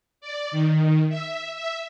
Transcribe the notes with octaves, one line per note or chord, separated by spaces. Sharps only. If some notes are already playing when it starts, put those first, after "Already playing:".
D5
D#3
E5
E5